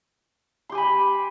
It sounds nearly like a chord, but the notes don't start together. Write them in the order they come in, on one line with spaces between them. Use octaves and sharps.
C6 G4 G#5 B5